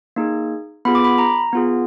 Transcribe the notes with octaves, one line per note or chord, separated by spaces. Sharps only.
A#3 D#4 G#4
B3 F4 G#4 B5
D6
B5
A#5
B3 F4 G#4